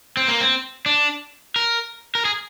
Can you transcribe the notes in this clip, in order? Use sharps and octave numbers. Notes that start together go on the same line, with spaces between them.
C4
A#3
C4
D4
A#4
A#4
G#4